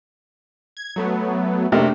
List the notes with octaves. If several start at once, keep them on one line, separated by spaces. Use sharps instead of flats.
G#6
F#3 A3 B3
C3 A3 A#3 D4